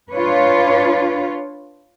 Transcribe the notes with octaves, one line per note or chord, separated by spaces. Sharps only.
D4 F4 B4 C#5